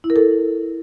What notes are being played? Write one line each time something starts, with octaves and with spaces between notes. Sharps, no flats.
E4
A#4
A4